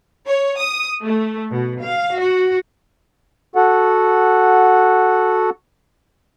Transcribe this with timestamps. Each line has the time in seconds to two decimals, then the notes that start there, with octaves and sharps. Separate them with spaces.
0.27 C#5
0.58 D#6
1.02 A3
1.51 B2
1.82 F5
2.18 F#4
3.55 F#4 A4 F#5